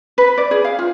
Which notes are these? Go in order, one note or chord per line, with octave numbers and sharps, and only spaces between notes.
B4
D5
G#4
F5
F4